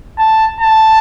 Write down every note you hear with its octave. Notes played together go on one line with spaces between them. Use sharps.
A5
A5